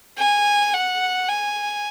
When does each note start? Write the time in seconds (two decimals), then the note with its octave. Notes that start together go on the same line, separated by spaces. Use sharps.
0.18 G#5
0.73 F#5
1.29 G#5